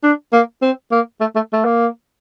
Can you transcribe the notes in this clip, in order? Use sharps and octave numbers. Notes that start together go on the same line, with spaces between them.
D4
A#3
C4
A#3
A3
A3
A3
A#3